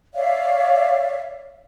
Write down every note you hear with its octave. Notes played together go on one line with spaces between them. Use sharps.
C#5 D5 E5 F5